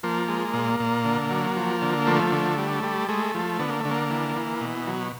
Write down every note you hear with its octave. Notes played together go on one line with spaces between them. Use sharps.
F3 A#3
G#3
A#2
A#2
D3
F#3
F3
D3
F3 A3
D3
G3
G3
G#3 A3
F3
D3 B3
A#3
D3 A3
A#3
E3
E3
B2
F#3